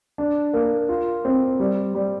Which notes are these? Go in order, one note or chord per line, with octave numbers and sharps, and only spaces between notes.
D4
A#3
F4
C4
G3
G3